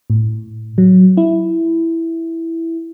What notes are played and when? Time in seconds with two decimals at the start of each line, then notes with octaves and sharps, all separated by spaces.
0.10 A2
0.78 F#3
1.17 E4